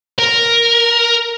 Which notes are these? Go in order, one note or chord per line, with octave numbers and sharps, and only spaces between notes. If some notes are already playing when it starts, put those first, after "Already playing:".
A#4